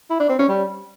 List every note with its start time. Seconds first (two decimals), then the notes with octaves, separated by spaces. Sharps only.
0.10 E4
0.20 D4
0.29 C4
0.39 C#4
0.49 G3